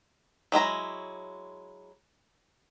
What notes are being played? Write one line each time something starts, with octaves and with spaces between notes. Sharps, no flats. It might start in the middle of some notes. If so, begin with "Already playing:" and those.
F#3 G#3 E4 A#5